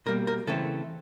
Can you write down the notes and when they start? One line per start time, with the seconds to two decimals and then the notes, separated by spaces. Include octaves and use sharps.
0.06 B2 G3 A#3 A#4
0.27 A#4
0.47 C#3 E3 A3 C4 A4